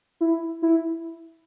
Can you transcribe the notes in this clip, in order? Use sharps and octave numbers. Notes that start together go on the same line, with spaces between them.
E4
E4